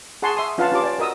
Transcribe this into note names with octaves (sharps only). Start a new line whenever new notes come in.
G#4 F#5 G#5 A5 C6 C#6
E5 C6 D#6
C#4 F4 B4 F5 F#5 A5
C#4 F4 G4 A5 D6
D5
F#4 A#4 D#5 D#6 E6